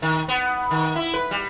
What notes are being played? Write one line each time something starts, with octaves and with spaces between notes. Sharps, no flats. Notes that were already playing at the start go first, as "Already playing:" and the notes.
D#3
B3
D#3
E4
B4
G3